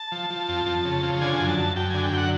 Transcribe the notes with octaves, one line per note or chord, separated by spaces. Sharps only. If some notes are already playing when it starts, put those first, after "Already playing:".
Already playing: A5
F3
F3
F2
F2
C#3
F3
D3 G#5
F#2
A5
F#2
F#2 G5
D3 G#5
G5
F#2
F#5